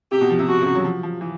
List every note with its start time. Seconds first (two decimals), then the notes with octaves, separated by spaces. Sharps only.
0.12 C3 G4
0.21 B2
0.30 F3
0.39 C3
0.48 B2 F#4
0.62 C#3
0.66 C3
0.75 F#3
0.85 F3
1.03 F3
1.21 E3